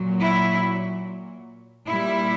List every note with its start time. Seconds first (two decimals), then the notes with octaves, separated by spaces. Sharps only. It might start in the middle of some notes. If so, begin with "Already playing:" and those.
Already playing: A#2 F#3
0.20 E4
1.86 A#2 G3 E4